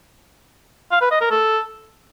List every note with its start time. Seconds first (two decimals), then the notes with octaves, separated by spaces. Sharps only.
0.92 F5
1.01 B4
1.11 D#5
1.21 A#4
1.31 A4